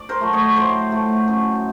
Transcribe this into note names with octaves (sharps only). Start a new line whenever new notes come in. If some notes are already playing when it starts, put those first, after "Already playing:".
Already playing: D5
A#4 C5
F#3 A3
C#5 D#5
A2 C5 D5
F#3 A3
F#2